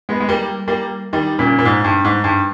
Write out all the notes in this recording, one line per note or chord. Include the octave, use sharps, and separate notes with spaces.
G#3 B3
G#3
G3 A#3
G3 A#3
D#3 G3
A#2 C#3
A#2
G#2
G2
G#2
G2